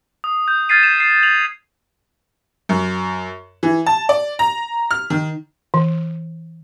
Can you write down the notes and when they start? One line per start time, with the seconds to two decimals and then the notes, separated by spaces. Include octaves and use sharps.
0.24 D#6
0.48 G6
0.69 F6 G#6 A6 B6 C7 D#7
0.83 E7
1.00 C7
1.23 F7 F#7
2.69 F#2
3.63 E3
3.86 A5
4.09 D5
4.39 A#5
4.91 F6
5.10 D#3
5.74 E3